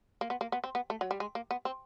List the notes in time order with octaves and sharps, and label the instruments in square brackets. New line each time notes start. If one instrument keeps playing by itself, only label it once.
[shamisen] A#3
B3
A#3
B3
C4
B3
A3
F#3
G3
G#3
A#3
B3
C4